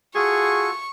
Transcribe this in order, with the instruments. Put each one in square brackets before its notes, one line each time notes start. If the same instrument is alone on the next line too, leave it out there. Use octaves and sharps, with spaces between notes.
[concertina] F4 F#4 A4 [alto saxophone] G#4 [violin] C#6